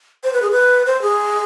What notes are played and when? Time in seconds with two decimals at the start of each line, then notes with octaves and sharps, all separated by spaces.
0.24 C5
0.33 B4
0.42 G#4
0.51 B4
0.86 C5
1.02 G#4